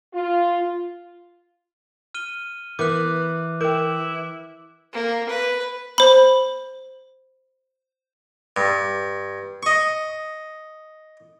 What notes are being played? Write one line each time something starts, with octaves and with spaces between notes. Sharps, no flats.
F4
F6 D#7 G7
E3 B3 A#4 D6 F#6
E4 A#4 G5 D6
A#3
B4
C5 B5
G2
D#5 C#6